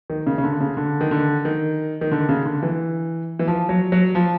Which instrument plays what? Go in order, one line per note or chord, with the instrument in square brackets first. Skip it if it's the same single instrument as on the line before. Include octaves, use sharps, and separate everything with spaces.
[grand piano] D#3
C#3
C#3
D3
C#3
D3
D#3
D3
D#3
D#3
D3
C#3
D3
E3
E3
F3
F#3
F#3
F3